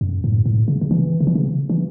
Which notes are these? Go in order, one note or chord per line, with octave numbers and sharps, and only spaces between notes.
F#2
A2
A2
C#3
C#3
E3
C#3
E3
C#3
E3